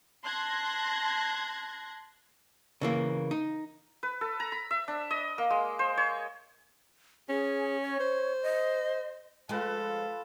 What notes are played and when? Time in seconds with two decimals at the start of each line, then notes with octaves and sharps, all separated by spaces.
0.24 A5 C6 F#6 G#6 A#6
2.81 C#3 E3 A#3
3.31 D#4
4.03 B4
4.21 A4
4.40 A#5
4.52 B5
4.71 E5
4.88 D4
5.11 D#5
5.38 A#3
5.50 G#3
5.79 C5
5.97 C#5
7.29 C#4 G#4
7.82 C#5
8.00 C5
8.42 D#5
9.49 F3 G#3 F4 A4 B4 G5